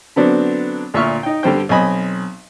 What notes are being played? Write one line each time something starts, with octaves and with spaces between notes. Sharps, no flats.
D3 F#3 B3 C4 D4
D2 A#2 E5 C#6 F6
D#4 G5
G2 D3 G3 C5 G5
B1 C4 D#5 G#5 B5